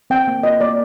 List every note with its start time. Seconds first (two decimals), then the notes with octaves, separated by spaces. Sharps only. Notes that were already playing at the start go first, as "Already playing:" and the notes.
0.10 C4 G5
0.28 A#3
0.43 F4 D#5
0.60 A#3 D5